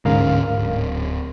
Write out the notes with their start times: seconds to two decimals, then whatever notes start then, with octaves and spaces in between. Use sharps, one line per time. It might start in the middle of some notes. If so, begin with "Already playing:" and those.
0.05 D1 G#2 D3 C#4 A#4 F5
0.57 D1